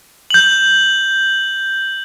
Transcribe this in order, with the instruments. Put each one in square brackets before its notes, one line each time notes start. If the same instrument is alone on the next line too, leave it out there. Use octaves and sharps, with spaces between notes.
[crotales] G6 F#7